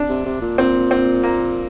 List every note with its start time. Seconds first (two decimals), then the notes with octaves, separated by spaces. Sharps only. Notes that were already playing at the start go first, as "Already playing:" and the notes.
Already playing: D4
0.09 C3
0.26 C3
0.42 A#2
0.58 A#2 C4
0.91 C4
1.23 A#3